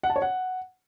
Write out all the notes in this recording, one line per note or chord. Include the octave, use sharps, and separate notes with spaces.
F#5
A5
C#5
F#5